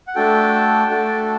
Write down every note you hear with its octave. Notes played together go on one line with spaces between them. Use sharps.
F#5
A3 D4 F#4 A4 G5
A3 D4 F#4 A4